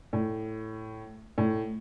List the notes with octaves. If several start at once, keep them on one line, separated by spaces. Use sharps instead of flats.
A2
A2